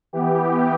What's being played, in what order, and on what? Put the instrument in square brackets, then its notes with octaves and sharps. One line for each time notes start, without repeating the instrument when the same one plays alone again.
[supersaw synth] E3 B3 G4